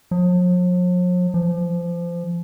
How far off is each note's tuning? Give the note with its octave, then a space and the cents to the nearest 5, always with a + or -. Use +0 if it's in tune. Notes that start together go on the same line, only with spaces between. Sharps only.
F3 +45
F3 -25